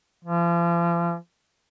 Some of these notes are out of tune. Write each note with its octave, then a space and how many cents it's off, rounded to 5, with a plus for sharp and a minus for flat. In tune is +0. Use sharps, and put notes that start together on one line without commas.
F3 -40